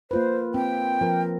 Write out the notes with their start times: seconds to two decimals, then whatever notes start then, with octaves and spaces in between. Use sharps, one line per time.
0.11 A#3 F4 B4 C5
0.54 C4 G5
1.01 F3 A#4